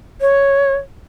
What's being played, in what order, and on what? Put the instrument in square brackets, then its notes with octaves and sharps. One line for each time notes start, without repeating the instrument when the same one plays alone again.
[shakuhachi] C#5